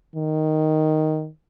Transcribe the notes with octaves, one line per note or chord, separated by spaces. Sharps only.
D#3